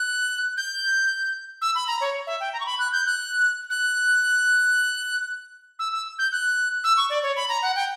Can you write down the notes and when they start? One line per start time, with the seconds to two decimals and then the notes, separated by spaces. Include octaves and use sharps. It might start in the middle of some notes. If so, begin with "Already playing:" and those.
Already playing: F#6
0.57 G6
1.62 E6
1.75 B5
1.87 A#5
2.01 C#5
2.27 E5
2.40 G5
2.53 A#5
2.60 C#6
2.66 B5
2.79 F#6
2.92 G6
3.06 F#6
3.70 F#6
5.79 E6
5.93 E6
6.19 G6
6.32 F#6
6.84 E6
6.97 C#6
7.10 D5
7.23 C#5
7.36 B5
7.49 A#5
7.62 F#5
7.75 G5